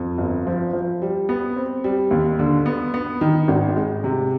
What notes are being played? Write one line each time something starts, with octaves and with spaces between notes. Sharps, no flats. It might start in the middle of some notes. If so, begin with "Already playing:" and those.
Already playing: F2
G1
F3
F3
G3
B3
C4
G3
D#2
D3
B3
B3
D#3
G#1
G#3
C3